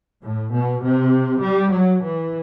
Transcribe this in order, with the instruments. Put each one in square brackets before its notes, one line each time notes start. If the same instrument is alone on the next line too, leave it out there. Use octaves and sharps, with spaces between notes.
[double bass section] A2
B2
C3
G3
F#3
E3